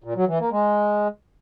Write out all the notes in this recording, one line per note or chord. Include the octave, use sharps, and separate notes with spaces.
A#2
F#3
E3
A#3
G#3